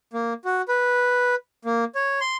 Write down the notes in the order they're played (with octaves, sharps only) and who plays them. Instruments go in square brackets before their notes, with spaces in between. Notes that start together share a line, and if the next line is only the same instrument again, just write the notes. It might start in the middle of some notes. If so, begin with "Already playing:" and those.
[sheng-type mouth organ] A#3
F#4
B4
A#3
C#5
C6